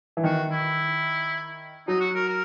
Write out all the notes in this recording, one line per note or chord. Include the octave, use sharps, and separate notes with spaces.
E3
D#3 F#4
E4
F#3 D#4
F#4
A#4
A#4